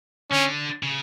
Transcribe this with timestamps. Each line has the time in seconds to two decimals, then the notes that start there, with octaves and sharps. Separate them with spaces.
0.31 D3 C#4
0.83 C#3